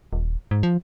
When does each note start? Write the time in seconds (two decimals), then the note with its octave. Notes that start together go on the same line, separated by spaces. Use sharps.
0.13 D#1
0.51 G#2
0.63 F3